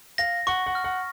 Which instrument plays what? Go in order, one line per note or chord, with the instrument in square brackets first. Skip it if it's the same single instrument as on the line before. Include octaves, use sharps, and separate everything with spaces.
[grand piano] F5 [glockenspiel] A#6
[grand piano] F#5 [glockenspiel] C#6
[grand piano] F#5
[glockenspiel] F6
[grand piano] F#5